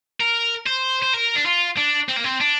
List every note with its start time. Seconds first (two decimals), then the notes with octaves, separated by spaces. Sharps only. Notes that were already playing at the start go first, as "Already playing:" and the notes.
0.20 A#4
0.67 C5
1.03 C5
1.14 A#4
1.36 D4
1.46 F4
1.77 D4
2.09 C4
2.16 A#3
2.24 C4
2.40 D4